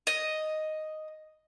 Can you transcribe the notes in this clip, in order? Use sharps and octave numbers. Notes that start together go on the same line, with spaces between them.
D#5